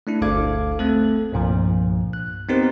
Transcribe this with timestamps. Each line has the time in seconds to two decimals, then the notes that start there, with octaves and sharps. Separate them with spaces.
0.07 A3 D4 E4
0.21 G1 D2 A4 F5 D6 G#6
0.79 A3 C4 A4
1.32 C2 G2 A#2 F3
2.13 F#6
2.49 B3 C4 D#4 G4 A#4 C5